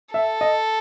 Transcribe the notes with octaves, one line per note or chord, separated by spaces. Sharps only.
A4 E5
D#5